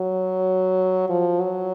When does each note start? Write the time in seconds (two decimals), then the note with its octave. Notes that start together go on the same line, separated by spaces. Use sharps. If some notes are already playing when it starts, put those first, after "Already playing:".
Already playing: F#3
1.10 F3
1.41 F#3